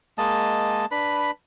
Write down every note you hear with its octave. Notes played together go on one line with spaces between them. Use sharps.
G#3 A#3 D#5 A5
D4 B4 B5